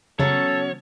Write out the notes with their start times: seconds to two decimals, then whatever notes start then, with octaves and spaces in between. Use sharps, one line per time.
0.19 C#3 F#3 B3 C#4 A4 C#5